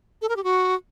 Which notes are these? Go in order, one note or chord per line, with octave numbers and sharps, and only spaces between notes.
A4
A#4
G4
F#4